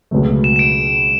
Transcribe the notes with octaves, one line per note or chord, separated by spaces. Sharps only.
C#2 B2 F#3 A3
E7
E7
D7